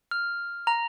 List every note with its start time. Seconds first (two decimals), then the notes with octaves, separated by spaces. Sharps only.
0.11 F6
0.67 A#5